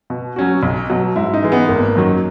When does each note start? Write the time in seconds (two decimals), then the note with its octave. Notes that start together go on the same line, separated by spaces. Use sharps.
0.10 B2
0.36 F#3 C#4 F#4
0.63 B1
0.90 B2 F#3
1.16 G#2 E4
1.34 D#4
1.43 E3 G#3
1.52 B3
1.69 G#1 A#3
1.95 F#2 D#3 F#3